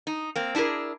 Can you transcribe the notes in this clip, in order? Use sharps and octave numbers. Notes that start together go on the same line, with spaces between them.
D#4
A#3 C4
D4 E4 F#4 G#4 A#4